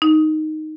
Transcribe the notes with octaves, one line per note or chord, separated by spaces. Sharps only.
D#4